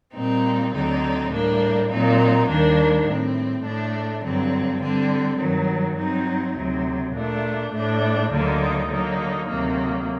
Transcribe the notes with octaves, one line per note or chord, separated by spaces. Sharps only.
A#2 G3 C4 D#4
D2 D3 F#3 C4 D#4
A2 G3 A#3 D4
A#2 F#3 C4 D#4
D#2 D#3 G3 A#3 D4
A2 G3 C4
A2 A3 D4
G2 D3 F#3 C4
D3 G3 C4
G2 D#3 F#3
G2 F#3 C4 D#4
D2 C3 F#3
A#2 A3 D4
A2 A3 D4
D2 D3 F#3 A#3 D#4
D3 F#3 A#3 D#4
D2 C3 D#3 F#3 A#3